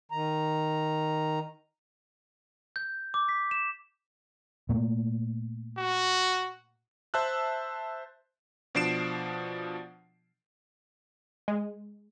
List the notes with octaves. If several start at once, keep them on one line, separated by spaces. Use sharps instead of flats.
D#3 A#5
G6
D6
B6
E7
A#2 A3 A#3
F#4
C5 E5 A5 E6 F#6
B2 F3 D4 C7 D7 E7
G#3